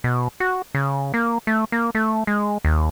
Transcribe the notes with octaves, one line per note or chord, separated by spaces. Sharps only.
B2
F#4
C#3
A#3
A3
A#3
A3
G#3
D#2